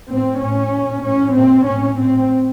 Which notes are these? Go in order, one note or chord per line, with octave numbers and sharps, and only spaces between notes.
A2 C4
A2 C#4
A#2
A2 C#4
A#2 C4
A2 C#4
A2 C4